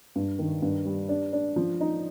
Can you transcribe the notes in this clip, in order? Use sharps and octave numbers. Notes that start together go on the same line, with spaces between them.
G2
D#3
G2
G3
D4
D4
F3
D#4